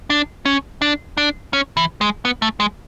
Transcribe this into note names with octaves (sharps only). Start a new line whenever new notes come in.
D4
C#4
D4
D4
C#4
E3
G#3
B3
A3
G#3